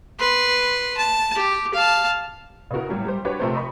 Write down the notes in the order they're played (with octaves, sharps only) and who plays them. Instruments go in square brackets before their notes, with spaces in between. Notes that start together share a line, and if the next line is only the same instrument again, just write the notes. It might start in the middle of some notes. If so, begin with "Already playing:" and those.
[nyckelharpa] B4 C6
A5
G4
F5 A5
[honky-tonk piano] C#3 B3 E4 F#4 A#4
A2 F#3 G3
G3 G4 C5
D4 F#4 G4 B4 C#5
C3 F3 A3 C4 A#4 C5
D#5 A#5 B5 C#6